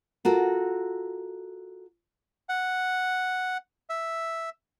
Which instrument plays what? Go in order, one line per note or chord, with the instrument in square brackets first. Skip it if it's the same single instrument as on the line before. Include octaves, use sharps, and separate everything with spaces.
[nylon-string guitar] F4 F#4 A4 A#4
[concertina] F#5
E5